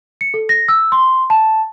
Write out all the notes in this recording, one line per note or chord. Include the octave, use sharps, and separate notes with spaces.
C#7
A4
A#6
E6
C6
A5